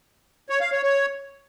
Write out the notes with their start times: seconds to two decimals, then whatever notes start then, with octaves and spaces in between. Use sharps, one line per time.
0.50 C#5
0.61 F5
0.72 C#5
0.83 C#5